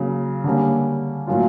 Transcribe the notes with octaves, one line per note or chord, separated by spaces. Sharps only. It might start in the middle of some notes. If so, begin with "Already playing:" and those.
Already playing: C#3 F#3 A#3
D3 G3 A#3 C#4
A2 F#3 A#3 C#4 F4